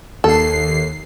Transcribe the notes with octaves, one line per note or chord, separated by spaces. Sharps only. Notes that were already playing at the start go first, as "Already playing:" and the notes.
D#2 A4 C7